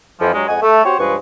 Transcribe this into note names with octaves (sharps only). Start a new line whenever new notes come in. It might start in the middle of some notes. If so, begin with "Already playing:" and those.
F2 E3 F3
G2 F#3 G#3
F2 G#3 D#5 F#5 G#5
A3
C4 F#4 G4 C5 C#5
C#2 G2 F3 G#3 B4 C#6